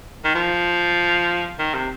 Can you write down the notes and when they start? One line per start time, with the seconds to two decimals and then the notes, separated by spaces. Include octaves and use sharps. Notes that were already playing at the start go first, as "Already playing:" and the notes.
0.24 D#3
0.35 F3
1.59 D#3
1.74 C3